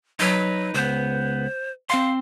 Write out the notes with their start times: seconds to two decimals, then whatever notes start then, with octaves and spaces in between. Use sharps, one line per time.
0.20 F#3 D#4 B4
0.74 C#2 B3 C5
1.90 C4 F5 C6